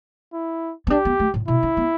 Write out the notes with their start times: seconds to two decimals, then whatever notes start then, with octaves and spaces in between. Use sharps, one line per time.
0.33 E4
0.87 B3
0.90 D4 G4
1.05 B3
1.20 A3
1.34 A2
1.48 B2 E4
1.63 D4
1.77 B3